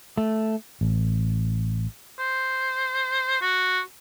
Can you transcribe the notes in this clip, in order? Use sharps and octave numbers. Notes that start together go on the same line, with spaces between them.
A3
A1
C5
F#4